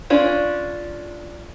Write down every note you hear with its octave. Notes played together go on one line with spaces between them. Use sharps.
C#4 D4 F4